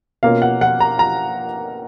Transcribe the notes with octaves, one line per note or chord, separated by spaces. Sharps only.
B2 A#3 C#4 F4 F5
F#5
F#5
A#5
A#5